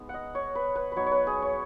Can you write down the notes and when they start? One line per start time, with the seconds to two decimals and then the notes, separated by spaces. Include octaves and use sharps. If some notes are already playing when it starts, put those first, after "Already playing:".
Already playing: G#3 B3 D#4
0.09 F#5
0.14 D#5
0.35 C#5
0.55 B4
0.76 B4
0.92 F#3 B3 D#4 B4 C#5
1.06 C#5
1.11 B4
1.27 G#4
1.42 C#5